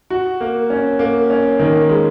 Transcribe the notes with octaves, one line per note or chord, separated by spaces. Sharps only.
F#4
A#3
C#4
A#3
C#4
D#3
G#3